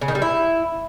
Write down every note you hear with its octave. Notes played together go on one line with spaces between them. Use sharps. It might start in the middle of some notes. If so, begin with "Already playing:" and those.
C#3
D#3
G3
E4